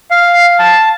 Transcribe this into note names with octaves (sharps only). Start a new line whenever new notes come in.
F5
A5